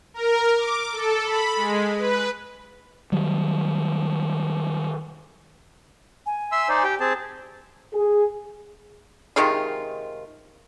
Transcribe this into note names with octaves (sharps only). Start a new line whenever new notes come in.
A#4
D6
A4
B5
G#3
B4
D#3 F#3 G3
G#5
E5 C6 E6
D#4 C5 D5
G4 G5
C4 G#4 A5
G#4
C3 D#3 G#3 F4